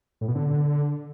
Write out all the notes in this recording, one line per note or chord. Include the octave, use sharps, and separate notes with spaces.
A2
B2
D3